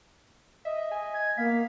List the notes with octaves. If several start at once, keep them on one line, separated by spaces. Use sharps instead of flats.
D#5 E5
G#5
G#6
A#3 B3 F5 B6